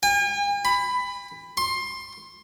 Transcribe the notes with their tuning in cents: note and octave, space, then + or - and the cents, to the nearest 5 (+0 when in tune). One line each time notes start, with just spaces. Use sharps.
G#5 -45
B5 +15
C6 +20